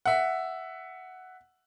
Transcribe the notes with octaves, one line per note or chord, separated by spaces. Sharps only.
E5 F#5